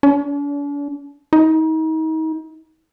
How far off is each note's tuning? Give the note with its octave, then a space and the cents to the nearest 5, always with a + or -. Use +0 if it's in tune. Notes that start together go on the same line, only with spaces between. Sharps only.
D4 -45
D#4 +35